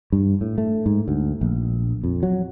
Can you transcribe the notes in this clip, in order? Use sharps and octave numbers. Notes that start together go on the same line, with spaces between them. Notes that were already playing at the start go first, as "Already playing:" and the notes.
G2
A2
A3
G#2
D2
A#1
F2
F#3